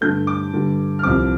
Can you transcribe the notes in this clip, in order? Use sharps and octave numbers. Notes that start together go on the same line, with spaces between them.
G2 D3 A3 G6
D6
G2 D3 G3
F6
C2 C3 F3 C4 D6